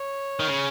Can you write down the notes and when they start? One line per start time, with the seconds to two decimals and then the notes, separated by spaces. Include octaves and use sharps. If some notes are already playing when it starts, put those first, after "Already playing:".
Already playing: C#5
0.39 D#3
0.48 C#3